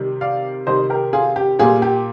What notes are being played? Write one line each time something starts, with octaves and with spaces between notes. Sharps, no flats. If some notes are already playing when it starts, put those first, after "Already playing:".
Already playing: C3 D#3 G3
D5 F5
C3 D#3 G3 C5 D#5
G4 A#4
F4 G#4
G4
A#2 G3 F4 G#4
G4